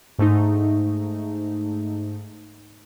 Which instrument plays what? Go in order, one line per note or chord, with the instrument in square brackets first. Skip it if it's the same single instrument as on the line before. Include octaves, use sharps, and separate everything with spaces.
[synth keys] G#2 A3 D#4